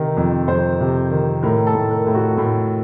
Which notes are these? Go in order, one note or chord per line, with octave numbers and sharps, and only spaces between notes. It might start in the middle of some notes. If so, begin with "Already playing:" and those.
Already playing: C3 D#3
F2
F2 C5
C3
D#3
A2 A#4
A4
A2
A#4
A2
F#4
A2